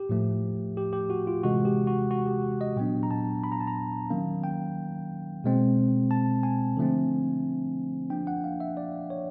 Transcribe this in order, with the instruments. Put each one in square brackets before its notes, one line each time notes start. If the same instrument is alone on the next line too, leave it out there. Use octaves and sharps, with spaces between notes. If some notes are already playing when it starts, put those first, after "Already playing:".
Already playing: [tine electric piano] G4
A2 F3 A3
G4
G4
F#4
F4
C3 E3 G#3 F#4
G4
F#4
F#4
G4
D#5
A#2 F#3 B3 D4 G5
A#5
A5
B5
A#5
A5
A#5
D#3 F#3 A#3 C#4 F5
G5
B2 G#3 C4
A5
G#5
D3 F3 A3 C4
F3 A#3 D4 G5
F#5
F5
E5
D5
C#5